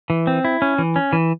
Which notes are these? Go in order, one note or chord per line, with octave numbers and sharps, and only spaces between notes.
E3
C4
E4
C#4
E3
C#4
E3